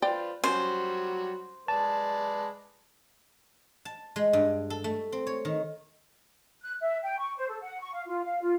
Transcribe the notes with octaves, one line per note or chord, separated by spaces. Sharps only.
F4 B4 C5 D5 G5
F#3 G3 C#4 F#4 C5
G#3 B4 D5 A5
A5
G#3
G2
A4
A3
C4
C#5
D#3
F#6
E5
G5
C#6
C5
A4
F#5
C#6
F5
F4
F5
F4